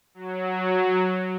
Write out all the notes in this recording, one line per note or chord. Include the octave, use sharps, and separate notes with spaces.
F#3